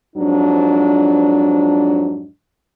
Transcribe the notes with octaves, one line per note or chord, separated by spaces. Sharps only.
F2 G#2 F#3 D4